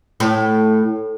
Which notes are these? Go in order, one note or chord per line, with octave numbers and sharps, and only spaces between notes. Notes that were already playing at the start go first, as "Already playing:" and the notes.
A2